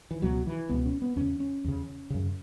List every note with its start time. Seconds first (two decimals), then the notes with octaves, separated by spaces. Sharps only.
0.11 E3
0.22 C#2 B2 F#3
0.47 E3
0.69 C#2 B2 B3
0.86 C#4
1.02 B3
1.16 E2 C#3 C#4
1.40 C#4
1.64 E2 C#3
2.10 F#2 C#3